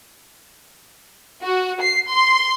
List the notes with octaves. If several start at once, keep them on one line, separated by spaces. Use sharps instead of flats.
F#4
C7
C6